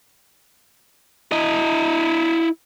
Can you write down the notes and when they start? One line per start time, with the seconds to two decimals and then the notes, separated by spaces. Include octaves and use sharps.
1.32 E4 D#5